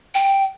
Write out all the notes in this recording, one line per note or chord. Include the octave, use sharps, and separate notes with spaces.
G5